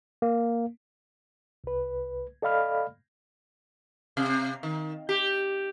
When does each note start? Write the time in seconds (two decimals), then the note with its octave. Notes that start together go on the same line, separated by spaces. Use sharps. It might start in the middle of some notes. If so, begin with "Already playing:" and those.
0.22 A#3
1.64 C2 B4
2.42 A4 D5 D#5 F5 B5 F6
4.17 C3
4.63 D#3
5.09 G4